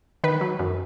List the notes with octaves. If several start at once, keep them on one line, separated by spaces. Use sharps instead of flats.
D#3 B4
F#3
F#2